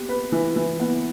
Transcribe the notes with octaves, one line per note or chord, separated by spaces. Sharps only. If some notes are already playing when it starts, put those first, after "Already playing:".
Already playing: B3 G4
B4
E3
E3
B3